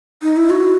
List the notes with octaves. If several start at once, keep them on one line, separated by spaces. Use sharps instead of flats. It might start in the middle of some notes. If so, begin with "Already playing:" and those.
D#4
E4
F#4